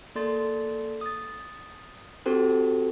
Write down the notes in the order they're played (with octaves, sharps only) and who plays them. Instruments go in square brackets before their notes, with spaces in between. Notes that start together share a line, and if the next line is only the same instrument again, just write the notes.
[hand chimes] A#3 A4 D5 C6 A6
D#6 A6
C4 F#4 G4 A4 C5